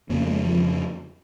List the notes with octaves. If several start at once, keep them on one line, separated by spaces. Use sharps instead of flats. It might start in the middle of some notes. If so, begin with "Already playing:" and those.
F2 C#3 A#3
G#3
F3